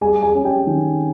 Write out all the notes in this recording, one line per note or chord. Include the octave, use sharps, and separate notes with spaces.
G3 G#4 G#5
G#4 G#5
C#4
G4 G5
D#3